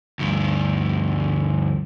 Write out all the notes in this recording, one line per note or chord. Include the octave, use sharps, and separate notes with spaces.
D2 G2